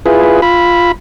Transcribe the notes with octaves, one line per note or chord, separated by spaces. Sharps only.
E4 F4 G#4 B4
F4 B5